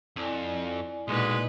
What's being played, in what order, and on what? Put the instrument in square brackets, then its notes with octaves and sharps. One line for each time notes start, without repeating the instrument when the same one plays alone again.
[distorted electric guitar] F2 [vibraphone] E4 D5 G#5
[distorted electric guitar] B1 [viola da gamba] A#2 D#4 B4 [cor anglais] G#3